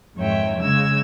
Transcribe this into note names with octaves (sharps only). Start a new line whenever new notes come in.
F2 G#2 D#3 C#5 E5 G5
C#3 G#3 E6 G#6